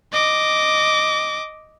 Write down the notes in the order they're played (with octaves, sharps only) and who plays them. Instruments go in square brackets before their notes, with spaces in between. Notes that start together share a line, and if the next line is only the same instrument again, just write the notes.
[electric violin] D#5 D6